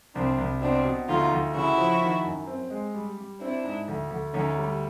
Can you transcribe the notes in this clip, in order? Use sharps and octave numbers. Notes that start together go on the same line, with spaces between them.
C2 C4 D4
C2
B2 C4 D4
B2
D2 D#4 F4
D2
C#3 E4 F#4
F3
D#3
F#2
C4
G#3
G3
G3
C4 D4 E4
G#2
D2
D2
D2 C#4 D#4
G3